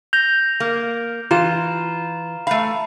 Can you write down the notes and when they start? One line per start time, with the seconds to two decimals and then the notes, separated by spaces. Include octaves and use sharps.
0.13 G6 A#6 F7
0.60 A#3
1.31 E3 F4 A#5 E7
2.47 A3 F5 B5